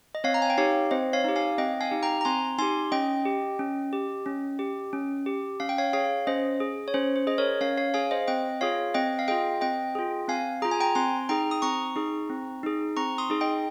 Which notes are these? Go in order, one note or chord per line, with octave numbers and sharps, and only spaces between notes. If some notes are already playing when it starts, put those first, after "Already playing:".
D#5
C4 C#5 F5
A#5
G#5
G5
D#4 G4 C#5 F5
C4 C5 D#5
C#5 F5
D#4 G4
F5 G#5
C4 D#5 G5
F5 G#5
D#4 G4
G5 A#5
A#5
C4 G#5 C6
D#4 G4 G#5 C6
C#4 D#5 G5
G4
C#4
G4
C#4
G4
C#4
G4
C#4 F5
G5
C#5 F5
G#4 C#5 F5
C#4 C5 D#5
G#4
C#5
C#4 C5
C5
G#4 D#5
A#4 C#5
C#4 C#5 F5
C#5 F5
G#4 F5 G#5
C5 D#5
C4 D#5 G5
F4 G#4 C#5 F5
C4 D#5 G5
F5
F4 G#4 D#5 G5
C4 D#5 G5
F4 G#4
C4 F5 G#5
F4 G#4 A#5
G#5
G5 A#5
C4 G#5 C6
D#4 G#4 G5 A#5
D#6
C4 A#5 C#6
D#4 G#4
C4
D#4 G#4
C4 A#5 C#6
C6 D#6
D#4 G#4
D#5 G5